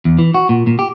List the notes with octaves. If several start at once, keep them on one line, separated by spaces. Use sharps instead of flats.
E2
E3
F#4
A#2
A#2
G4